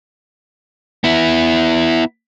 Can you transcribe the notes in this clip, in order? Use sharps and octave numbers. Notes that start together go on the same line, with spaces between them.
B3 E4